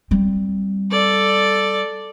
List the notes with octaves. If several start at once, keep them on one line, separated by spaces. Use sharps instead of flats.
G3 C4
A4 D5